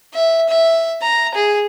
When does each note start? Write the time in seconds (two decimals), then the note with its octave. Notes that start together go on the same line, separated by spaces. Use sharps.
0.14 E5
0.49 E5
1.02 A#5
1.35 G#4